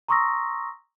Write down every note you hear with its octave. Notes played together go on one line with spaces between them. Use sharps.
A#5 C6 C#6 D#6 E6 A#6